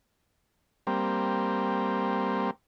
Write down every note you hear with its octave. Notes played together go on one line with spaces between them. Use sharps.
G3 A#3 C4